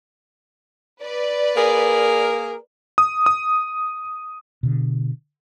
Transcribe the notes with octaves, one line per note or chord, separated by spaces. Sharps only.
B4 D5
A#3 G#4 A#4
D#6
D#6
B2 D3